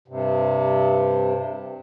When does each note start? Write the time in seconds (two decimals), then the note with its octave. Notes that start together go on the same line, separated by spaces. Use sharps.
0.08 G2 C3